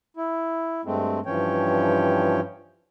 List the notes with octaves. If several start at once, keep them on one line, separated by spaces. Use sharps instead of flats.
E4
G2 G#3 A3 C4
G2 E3 F3 C#4 C#5 G5